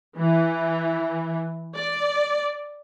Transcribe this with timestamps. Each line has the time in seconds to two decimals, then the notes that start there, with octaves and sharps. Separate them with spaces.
0.17 E3
1.75 D5